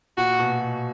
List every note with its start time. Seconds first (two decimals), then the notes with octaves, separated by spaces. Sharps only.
0.17 A#2 F#4
0.39 B2